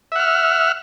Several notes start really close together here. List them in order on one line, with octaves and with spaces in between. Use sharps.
E5 F#5 F6